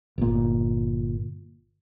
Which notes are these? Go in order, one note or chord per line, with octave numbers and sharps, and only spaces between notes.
G1 A#2